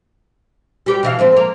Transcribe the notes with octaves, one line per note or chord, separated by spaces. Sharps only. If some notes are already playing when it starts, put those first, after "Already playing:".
G3 G4 B4
B2 E3 F5
F3 A3 C4
A#3